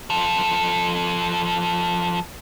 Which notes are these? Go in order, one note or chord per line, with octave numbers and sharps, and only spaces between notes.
F3 A4